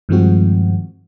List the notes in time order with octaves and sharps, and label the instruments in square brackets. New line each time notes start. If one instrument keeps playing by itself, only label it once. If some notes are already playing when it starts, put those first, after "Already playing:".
[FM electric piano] G2 D#3 F3 G#3 C4 F#4